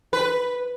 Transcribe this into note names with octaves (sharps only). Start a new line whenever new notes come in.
B4